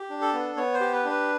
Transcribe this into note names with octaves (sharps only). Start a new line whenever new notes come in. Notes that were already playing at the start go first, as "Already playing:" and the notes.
Already playing: G4
D4
A4
B3
B3 C#5
C5
G4
B4
D4 B4